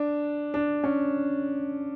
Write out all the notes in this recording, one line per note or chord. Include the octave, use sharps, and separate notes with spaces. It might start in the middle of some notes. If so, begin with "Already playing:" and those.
Already playing: D4
D4
C#4